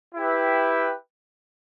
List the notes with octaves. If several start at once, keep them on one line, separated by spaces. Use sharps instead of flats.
E4 G4 B4 E5 G5